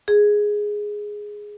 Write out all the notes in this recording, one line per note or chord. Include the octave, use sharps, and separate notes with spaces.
G#4